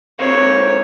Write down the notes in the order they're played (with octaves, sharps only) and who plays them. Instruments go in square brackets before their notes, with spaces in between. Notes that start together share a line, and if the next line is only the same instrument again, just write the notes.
[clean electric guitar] C3 A#4 F5 [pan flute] C5 [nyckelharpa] C#5